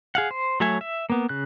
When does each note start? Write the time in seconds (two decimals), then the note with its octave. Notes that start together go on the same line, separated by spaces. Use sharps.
0.15 G#4 F5 F#5
0.31 C5
0.60 F#3 A3 C#5 E5 G#5
0.81 E5
1.10 A#3 B3
1.29 C#3 F#6